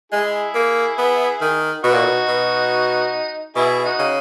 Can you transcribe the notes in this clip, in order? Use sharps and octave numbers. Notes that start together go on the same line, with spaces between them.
G#3 E4 G#4
A#3
B3
D#3
B2 D#4 F#4
A#2
B2
B2
B2 E4 G#4
G#4
D#4 F#4
C#3